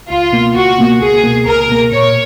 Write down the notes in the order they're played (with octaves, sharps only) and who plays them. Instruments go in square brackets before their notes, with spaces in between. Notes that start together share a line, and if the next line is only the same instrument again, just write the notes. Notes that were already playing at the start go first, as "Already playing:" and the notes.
[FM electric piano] C#2 [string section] F4
[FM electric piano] B2 A#3
[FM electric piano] C#2 [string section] F#4
[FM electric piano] B2 A#3
[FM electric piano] C#2 [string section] G#4
[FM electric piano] B2 A#3
[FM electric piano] C#2 [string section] A#4
[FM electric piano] B2 A#3
[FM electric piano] A#2 [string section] C#5